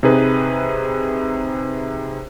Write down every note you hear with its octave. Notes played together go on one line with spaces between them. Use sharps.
C3 D#4 G#4 B4